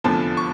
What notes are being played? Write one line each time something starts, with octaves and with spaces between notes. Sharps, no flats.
F1 E2 D3 F3 A5
C#6